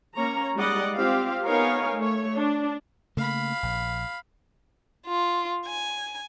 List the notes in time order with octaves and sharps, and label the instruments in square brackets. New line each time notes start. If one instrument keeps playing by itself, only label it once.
[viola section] A#3 C#4 C#5 A#5
G3 G#3 D#4 D5 D#5 F#5
C4 F4 G4 F5
B3 D#4 A#4 C#5 F5 G#5
A3 C#5
D4
[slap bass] C#3 A3 A#3 [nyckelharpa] F5 B5
[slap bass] A#1
[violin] F4
G#5